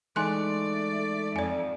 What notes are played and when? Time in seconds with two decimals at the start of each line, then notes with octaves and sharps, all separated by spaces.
0.16 E3 G#3 A3 D#4 D5 G#5 C6 F#6
1.36 F2 D5 G#5